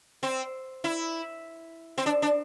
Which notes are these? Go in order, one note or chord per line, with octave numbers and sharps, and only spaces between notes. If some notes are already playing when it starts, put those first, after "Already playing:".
C4
E4
C4
D4
D4